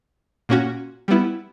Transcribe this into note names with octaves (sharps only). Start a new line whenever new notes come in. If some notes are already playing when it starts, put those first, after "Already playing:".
A#2 A#3 C#4 F#4
G3 B3 E4